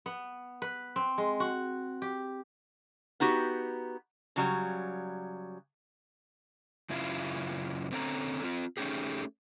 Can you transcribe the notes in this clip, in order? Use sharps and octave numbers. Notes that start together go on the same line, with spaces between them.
B3
B4
C4
G#3
F#4
G4
B3 D#4 F#4 G4
C#3 F#3 G3
F#2 C#3 E4 F4
D3 C4 C#4 A4 A5 A#5
C4 F4
A3 C#4 D#4 G4 G#4